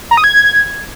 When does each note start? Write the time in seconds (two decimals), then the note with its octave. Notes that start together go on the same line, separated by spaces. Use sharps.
0.11 A#5
0.17 D#6
0.24 G#6